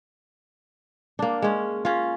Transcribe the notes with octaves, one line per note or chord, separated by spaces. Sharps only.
A#3 D4
G#3 C#4
C#4 F4